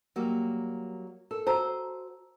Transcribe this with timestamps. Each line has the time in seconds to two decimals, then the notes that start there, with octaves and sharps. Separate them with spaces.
0.16 F#3 G3 A#3 A#4
1.31 A4 A#4
1.47 F#4 C5 A5 A#5 E6